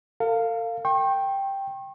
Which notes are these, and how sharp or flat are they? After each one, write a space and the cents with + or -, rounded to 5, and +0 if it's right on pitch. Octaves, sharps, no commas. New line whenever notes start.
A4 +45 F5 +0
G5 +0 C#6 -40